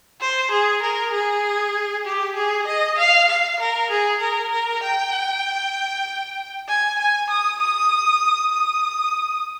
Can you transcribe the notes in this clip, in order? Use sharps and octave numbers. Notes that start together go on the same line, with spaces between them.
C5
G#4
A#4
G#4
G4
G#4
D#5
F5
F5
A#4
G#4
A#4
A#4
G5
G#5
G#5
D#6
D#6
D#6